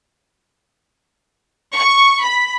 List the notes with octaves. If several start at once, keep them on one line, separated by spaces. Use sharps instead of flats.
C#6
B5